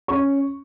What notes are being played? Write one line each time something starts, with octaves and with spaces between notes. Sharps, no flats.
C#4 C#6